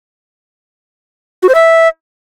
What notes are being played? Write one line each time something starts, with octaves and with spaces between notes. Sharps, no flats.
F#4
C5
E5